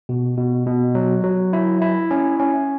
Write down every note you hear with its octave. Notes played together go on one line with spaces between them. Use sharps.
B2
B2
B2
F#3
F#3
E4
E4
C#4
C#4